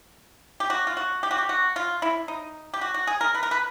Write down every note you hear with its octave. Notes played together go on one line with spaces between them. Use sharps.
G4
F#4
F4
F#4
G4
F#4
G4
F#4
F4
E4
D#4
G4
F#4
F#4
G#4
A#4
B4
A#4
B4